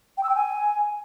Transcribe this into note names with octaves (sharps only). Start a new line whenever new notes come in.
G5
E6
G5
G#5